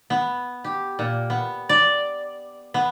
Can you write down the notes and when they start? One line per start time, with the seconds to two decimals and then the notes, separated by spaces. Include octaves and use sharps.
0.10 B3
0.64 G4
0.99 A#2
1.30 B3
1.69 D5
2.74 B3